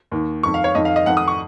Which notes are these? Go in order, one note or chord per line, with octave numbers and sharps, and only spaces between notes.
D#2 D#3
F2 D#3 C#6
F5
C#5
F2 D#3 D#5
F5
D#5
F2 D#3 F#5
D#6
C#6